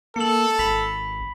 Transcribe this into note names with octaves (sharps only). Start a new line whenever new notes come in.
A#3 A4 C#7 F#7
G#1 B5 B6 F#7